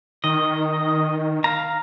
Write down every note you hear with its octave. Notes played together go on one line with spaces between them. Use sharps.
D#3 D#5
F5 A#5